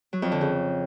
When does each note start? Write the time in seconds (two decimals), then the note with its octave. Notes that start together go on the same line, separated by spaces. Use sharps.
0.13 F#3
0.22 F2
0.32 D3
0.41 C#3